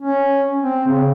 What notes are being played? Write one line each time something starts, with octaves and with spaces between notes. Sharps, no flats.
C#4
C4
C#3